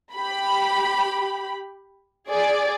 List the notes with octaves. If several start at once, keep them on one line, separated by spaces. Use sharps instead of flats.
G4 B5
G#4 D5